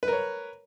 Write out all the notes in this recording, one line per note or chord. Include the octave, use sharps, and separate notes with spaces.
A#4 B4 C#5